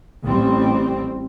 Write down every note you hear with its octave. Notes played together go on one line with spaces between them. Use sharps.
A1 G3 C4